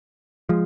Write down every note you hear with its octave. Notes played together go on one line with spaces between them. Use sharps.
F3 G#3